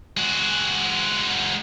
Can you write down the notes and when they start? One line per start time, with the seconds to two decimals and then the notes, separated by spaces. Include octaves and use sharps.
0.17 G#3 F#4